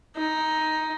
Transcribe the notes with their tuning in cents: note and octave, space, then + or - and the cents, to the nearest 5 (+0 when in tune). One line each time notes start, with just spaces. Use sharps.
D#4 +10